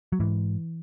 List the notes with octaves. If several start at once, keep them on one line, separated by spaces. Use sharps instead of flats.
F#3
G#2 E3